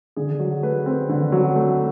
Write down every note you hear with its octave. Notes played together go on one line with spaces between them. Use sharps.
D3 G#4
F#3
A3 B4
C4
D3
F#3
A3